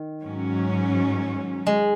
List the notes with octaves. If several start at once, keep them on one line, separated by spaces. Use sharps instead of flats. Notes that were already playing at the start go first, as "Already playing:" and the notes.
Already playing: D#3
G#2 F#3 C#4
G#3